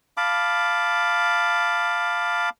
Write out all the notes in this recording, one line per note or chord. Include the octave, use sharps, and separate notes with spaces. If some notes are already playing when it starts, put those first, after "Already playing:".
F5 A5 B5 D6